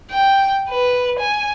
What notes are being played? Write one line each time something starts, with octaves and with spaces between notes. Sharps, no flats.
G5
B4
G#5